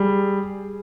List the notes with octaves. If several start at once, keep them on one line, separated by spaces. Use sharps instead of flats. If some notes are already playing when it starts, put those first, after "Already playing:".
Already playing: G3 G#4